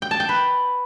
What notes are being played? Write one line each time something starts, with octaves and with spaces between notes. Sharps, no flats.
G5
A5
G5
B4